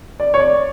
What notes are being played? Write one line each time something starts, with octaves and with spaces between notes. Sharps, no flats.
D5
C#5
D5